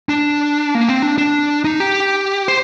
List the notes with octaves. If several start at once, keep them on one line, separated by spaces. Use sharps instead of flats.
D4
A#3
C4
D4
D4
D#4
G4
C5